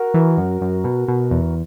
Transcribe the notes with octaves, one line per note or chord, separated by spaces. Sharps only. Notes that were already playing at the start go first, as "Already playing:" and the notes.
Already playing: F#4 A#4
E3
F#2
F#2
B2
B2
E2